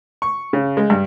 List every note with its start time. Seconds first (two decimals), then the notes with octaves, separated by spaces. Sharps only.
0.22 C#6
0.53 C#3
0.77 G#3
0.90 G2